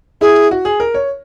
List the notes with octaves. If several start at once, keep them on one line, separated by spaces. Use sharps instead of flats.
E4 G#4
F#4
G#4
A#4
C#5